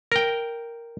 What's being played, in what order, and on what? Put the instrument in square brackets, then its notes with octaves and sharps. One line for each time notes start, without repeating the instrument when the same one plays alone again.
[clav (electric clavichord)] A#4 G5